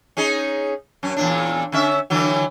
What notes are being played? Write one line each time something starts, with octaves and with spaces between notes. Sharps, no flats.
C#4 D#4 G#4
F#2 C#4
E2 A#2 D4
D3 C#4 E5
D3 E3 F#3